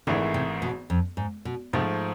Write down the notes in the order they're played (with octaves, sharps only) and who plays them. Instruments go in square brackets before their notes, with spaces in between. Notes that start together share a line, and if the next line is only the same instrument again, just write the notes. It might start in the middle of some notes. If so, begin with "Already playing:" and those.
[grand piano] G#1 G#2 E3 A3 E4 [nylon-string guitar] D3
[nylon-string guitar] C3
B2
F2
G#2
B2
[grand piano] G#2 F3 A3 [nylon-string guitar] C3